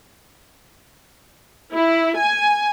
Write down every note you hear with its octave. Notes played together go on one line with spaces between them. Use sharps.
E4
G#5